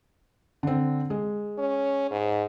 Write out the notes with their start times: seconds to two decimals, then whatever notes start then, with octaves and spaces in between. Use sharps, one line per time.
0.63 D3 C4
1.10 G#3
1.58 C#4
2.11 G#2